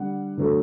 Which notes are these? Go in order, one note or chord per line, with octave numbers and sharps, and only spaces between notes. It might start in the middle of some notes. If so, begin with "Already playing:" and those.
Already playing: D3 G3 F#5
D3 F#3 A3